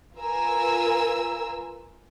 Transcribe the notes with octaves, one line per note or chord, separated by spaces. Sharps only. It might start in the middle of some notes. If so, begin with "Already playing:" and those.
F4 A#4 B4 G#5 A#5 E6